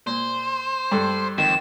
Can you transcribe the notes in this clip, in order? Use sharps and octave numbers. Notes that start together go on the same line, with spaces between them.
A#2 C5
G2 A4
F2 D#3 E7